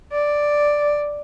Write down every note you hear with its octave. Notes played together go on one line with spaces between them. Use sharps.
D5